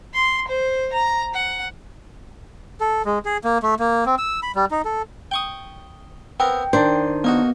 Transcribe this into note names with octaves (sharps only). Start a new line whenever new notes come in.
C6
C5
A#5
F#5
A4
G#3
G#4
A#3
A3
A#3
C4
E6
B5
G3
D#4
A4
G5 C#6 D#6
B3 C4 A#4 G5
D#3 D4 C5 D5
A#3 B3 D#4 F#4